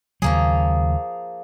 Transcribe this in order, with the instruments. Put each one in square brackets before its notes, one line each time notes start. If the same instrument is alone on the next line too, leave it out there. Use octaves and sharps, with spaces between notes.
[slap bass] D#2 C#3 F#3 [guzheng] F3 A#3 G#4